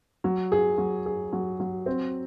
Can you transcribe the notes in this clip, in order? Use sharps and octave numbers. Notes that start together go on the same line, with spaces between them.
F#3
G#4
F#3
G#4
F#3
F#3
C4